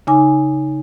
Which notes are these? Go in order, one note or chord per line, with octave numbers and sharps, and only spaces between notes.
C#3 D#4 G#5 D6